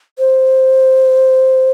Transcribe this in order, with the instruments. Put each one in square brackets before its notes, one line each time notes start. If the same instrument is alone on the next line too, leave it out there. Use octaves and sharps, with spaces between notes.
[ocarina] C5